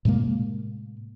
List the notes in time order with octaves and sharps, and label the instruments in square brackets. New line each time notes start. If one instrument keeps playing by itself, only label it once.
[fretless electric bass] A2 C3 G#3 A#3